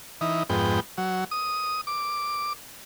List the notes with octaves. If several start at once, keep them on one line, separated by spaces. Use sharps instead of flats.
E3 D#4
F2 G#2 B3 G5
F#3
D#6
D6